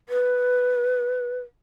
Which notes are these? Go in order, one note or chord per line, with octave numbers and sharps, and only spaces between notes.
B4